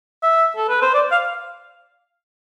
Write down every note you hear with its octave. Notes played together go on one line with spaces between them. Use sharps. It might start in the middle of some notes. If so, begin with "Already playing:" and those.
E5
A4
B4
C5
D5
F5